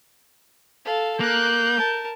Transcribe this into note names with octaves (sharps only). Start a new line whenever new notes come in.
A4 F5
A#3 F#6 G6
A#4 A5